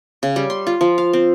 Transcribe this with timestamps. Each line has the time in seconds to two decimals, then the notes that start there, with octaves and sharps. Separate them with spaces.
0.23 C#3
0.36 G3
0.50 C6
0.67 F4
0.81 F3
0.98 F5
1.13 C4